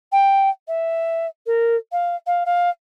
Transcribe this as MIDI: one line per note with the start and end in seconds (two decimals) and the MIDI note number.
0.12 0.49 79
0.67 1.26 76
1.46 1.76 70
1.92 2.15 77
2.26 2.43 77
2.45 2.69 77